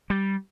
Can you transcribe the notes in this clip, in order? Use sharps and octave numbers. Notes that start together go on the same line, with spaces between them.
G3